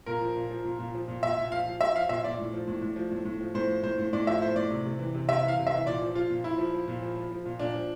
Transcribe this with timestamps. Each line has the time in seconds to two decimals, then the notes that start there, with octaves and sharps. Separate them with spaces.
0.06 A#2 A#4
0.21 F3
0.36 A#2
0.50 F3
0.64 A#2
0.79 A#2
0.94 F3
1.08 A#2
1.23 A#2 E5
1.37 A#2
1.52 F3 F5
1.66 F3
1.80 F3 E5
1.95 F3 F5
2.09 A#2 E5
2.24 A#2 D5
2.39 A2
2.53 F3
2.68 A2
2.82 A2
2.96 F3
3.11 A2
3.25 A2
3.41 F3
3.55 A2 C5
3.69 F3
3.83 A2 C5
3.98 A2
4.13 A2 D5
4.27 F3 E5
4.42 A2 C5
4.56 A2 D5
4.71 C3
4.85 C3
4.99 E3
5.14 C3
5.28 C3 E5
5.43 E3
5.48 F5
5.58 C3
5.67 E5
5.72 E3
5.86 A#2 D5
6.01 F3
6.15 F3 F4
6.30 A#2
6.44 A#2 E4
6.58 F3
6.74 F3
6.88 A#2
7.02 F3
7.16 F3
7.32 F3
7.45 A#2
7.60 A#2 D4
7.75 F3